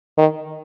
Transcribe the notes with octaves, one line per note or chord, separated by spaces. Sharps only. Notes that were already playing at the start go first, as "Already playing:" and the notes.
D#3